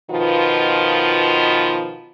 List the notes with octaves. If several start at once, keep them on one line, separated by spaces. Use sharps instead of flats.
B2 D#3 F3 B3 F4